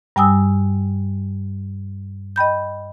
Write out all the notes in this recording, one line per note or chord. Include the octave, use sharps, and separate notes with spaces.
G2 G3 G5 G#5 D#6 E6
D#5 G5 B5 G6